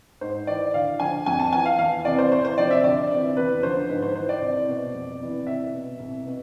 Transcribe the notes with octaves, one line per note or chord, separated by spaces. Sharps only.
G#2 C5
E3 D5
D2 F5
D3 F3 G#5
F2 G#5
A5
E3 G#5
F5
E2 F5
C3 E3 D5
C5
C2 C5
C5
C3 F3 D5
E5
D2 D5
C3 E3
E2 B4
D3 F3 C5
G#2 B4
C5
E3 C5
D5
C2
B2
F2
C3 E3
C2 E5
B2
C2
B2